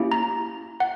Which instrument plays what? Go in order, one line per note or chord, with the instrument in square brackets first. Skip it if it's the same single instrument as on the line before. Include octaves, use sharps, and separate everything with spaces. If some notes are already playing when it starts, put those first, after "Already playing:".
Already playing: [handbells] A#3 C#4 E4 G4
A#5
F#5